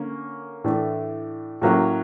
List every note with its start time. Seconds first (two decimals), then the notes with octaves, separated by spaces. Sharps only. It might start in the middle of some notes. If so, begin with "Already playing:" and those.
Already playing: D3 A#3 C#4
0.64 A2 E3 A3 D4
1.62 A2 F#3 A#3 C#4